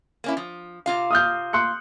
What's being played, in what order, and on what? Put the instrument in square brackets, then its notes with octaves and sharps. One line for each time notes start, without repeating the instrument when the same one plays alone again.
[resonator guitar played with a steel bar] A#3 C#4 E4
F3
C3 F4 F5
[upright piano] D#6 F6 G6
C6 F#6 C#7